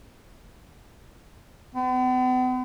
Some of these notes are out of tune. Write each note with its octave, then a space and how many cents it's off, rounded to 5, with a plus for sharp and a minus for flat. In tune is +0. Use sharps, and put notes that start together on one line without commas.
B3 +45